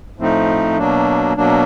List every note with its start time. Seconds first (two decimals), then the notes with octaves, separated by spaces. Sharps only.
0.18 A2 F3 A3 C4 D#4
0.78 B2 F#3 A#3 D4
1.37 B2 F#3 A#3 D4